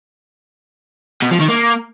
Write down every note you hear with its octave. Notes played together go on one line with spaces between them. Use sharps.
B2
F3
D#3
A#3